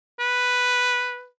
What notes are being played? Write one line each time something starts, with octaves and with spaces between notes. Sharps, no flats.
B4